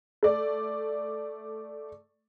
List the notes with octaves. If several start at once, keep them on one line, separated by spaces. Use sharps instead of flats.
A3 D5